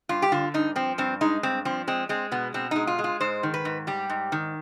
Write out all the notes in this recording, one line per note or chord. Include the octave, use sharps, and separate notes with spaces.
G2 F4
G4
D3 F4
G2 D#4
F3 C4
G2 C4
G#3 D#4
G2 C4
F3 C4
G#3 C4
G#3 C4
B2 B3
B2 C4
G#3 D#4
F4
G#3
F4
G#2 C5
D#3
B4
G#2
G3 G4
G#2
D#3